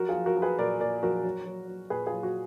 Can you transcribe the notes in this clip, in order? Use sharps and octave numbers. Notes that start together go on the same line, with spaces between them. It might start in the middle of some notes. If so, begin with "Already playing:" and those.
Already playing: F3 F#3 F#4 A#4
F4 G#4
F3
F#4 A#4
F3
G#4 B4
A#2 A#4 D5
A#2 A#4 D5
F3 F#4 A#4
F#3
F#3
F#3
A#2 G#4 B4
F4 G#4
F#3
F#4